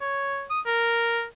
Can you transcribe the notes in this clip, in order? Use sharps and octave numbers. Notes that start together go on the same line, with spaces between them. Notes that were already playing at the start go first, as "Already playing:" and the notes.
C#5
D#6
A#4